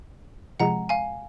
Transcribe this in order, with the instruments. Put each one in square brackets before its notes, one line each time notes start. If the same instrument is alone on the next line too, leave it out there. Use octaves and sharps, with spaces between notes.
[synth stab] C3 F3 G#3 [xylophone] F#5 A#5
[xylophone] F5 G#5